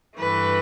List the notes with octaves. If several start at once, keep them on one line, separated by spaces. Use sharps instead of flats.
G2 E3 A3 B4